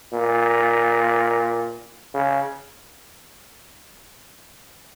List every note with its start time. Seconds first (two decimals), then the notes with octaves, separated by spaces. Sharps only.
0.13 A#2
2.14 C#3